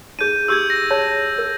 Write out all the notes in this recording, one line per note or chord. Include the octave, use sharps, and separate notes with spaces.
D#4 G#4 G6 D#7
D#4 G4 D6 E6 G6 G#6
A#6
G#4 C#5 A5
A#4